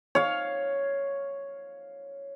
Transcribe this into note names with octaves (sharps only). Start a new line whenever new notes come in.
C#5 F5